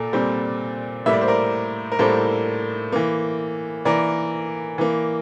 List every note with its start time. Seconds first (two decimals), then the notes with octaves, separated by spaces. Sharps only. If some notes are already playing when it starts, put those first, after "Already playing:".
Already playing: A#2 A4 A#4
0.13 A#2 G3 C4
1.06 A2 G3 A#3 E5
1.13 D5
1.21 C5
1.28 A#4 D5
1.92 A#4
1.99 A2 G3 A#3 A4 C5
2.92 E3 A#3
3.85 E3 A#3 A#4 D5
4.78 E3 A#3